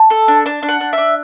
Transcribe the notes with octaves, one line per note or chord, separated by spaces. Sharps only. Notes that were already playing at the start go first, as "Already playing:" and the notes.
Already playing: A5
A4
D4
D4 A5
D4
F#5
D4
E5
D4